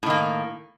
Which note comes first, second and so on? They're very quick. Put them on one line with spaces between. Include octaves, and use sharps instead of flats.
A2 D#3 A#3